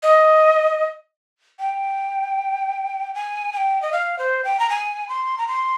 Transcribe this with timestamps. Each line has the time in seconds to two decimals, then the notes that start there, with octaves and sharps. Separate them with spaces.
0.03 D#5
1.59 G5
3.14 G#5
3.53 G#5
3.57 G5
3.82 D#5
3.92 F5
4.19 C5
4.45 G5
4.59 A#5
4.70 G#5
5.09 C6
5.38 A#5
5.48 C6